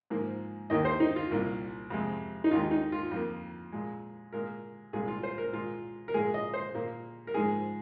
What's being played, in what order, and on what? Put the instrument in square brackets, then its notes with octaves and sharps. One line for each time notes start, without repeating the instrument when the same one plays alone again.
[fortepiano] G#2 F3 A#3
D#2 D#3 A#3 D#5
C5
D#4
F4
C2 A#2 A#3
F2 C3 G#3
D#4
D#2 D#3 G#3 F4
D#4
F4
F2 F3 A#3
A#2 G#3
A#2 G#3 A#4
C2 A#2 F3 G#3 G#4
F4
C5
A#4
A#2 G#3 F4
A#4
A#2 F3 G#3 G#4
D#5
C5
A#2 A#3
A#4
G#2 F3 G#3 G#4